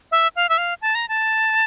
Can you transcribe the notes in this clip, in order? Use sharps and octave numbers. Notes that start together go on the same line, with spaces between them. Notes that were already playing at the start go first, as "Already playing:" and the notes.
E5
F5
E5
F5
A5
A#5
A5